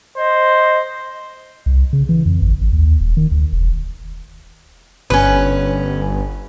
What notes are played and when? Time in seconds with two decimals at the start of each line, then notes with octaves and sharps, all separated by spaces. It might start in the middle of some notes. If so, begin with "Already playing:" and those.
0.17 C5 D#5
1.66 C2
1.93 C#3
2.09 E3
2.26 F2
2.42 G#1
2.61 A1
2.73 D#2
3.00 D#1
3.17 D#3
3.32 D2
3.53 E1
5.10 G1 C#4 B4